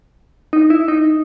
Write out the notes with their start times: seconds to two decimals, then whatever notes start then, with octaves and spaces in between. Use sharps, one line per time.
0.53 D#4
0.70 E4
0.88 D#4